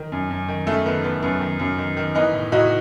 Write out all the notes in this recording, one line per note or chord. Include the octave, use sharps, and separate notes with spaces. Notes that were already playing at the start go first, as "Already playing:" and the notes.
Already playing: D#3
F#2
F#2
D#3
F#2 A3
D#3 B3
D#3 B3
F#2 B3
D#3
F#2
D#3
D#3
E3 B3 D#4
A2
A2 D#4 F#4